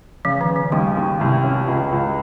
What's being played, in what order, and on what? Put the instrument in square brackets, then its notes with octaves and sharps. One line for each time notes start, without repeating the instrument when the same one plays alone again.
[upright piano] C#3 [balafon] F3
[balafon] D#3
[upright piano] C#3
[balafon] F3
[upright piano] D#2 [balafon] G3
[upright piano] D#2
[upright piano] C2 [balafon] G#3
[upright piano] C#4
C#2
C#2